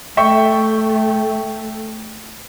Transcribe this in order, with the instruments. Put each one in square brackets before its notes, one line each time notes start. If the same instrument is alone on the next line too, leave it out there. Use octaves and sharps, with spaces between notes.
[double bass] A3 [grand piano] E5 G5 C#6